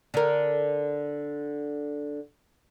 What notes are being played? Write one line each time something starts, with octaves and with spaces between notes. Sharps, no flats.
D3 A#4